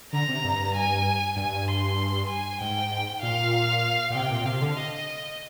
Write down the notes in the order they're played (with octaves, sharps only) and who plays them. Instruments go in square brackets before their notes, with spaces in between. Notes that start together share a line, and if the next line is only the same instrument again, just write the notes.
[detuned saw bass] D3 [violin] A#5
[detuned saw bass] C3
G2
[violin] G#5
[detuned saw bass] G2 [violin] G#5
[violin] C6
G#5
[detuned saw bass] G#2 [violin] G5
[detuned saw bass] A#2 [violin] F5
[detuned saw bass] A#2
[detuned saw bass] C3 [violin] G5
[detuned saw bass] A#2
A#2
[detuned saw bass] C3 [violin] F5
[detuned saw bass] D3
[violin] D#5